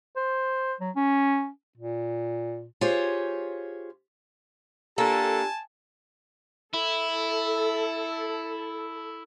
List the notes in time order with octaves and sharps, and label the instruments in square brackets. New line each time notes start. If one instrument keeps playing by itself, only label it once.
[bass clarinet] C5
F#3
C#4
A#2
[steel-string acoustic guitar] F4 G4 G#4 C5 C#5
[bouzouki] A#3 [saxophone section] D4 F4 A4 [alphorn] G4 [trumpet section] G#5 A5
[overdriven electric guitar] E4 [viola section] A4